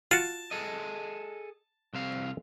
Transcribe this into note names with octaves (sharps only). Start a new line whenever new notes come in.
F4 F#4 A5
G#4 A4 D#5
C2 C4 F5